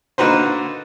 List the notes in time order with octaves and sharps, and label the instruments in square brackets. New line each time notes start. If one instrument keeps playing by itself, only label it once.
[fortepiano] D3 A#3 D#4 F#4 B4 C5